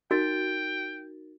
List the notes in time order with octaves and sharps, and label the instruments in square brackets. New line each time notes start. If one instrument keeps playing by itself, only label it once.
[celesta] D#4 A#4 A6 [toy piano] F#4 [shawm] G5